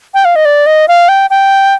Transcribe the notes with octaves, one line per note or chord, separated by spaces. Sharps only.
G5
F5
D#5
D5
D#5
F5
G5
G5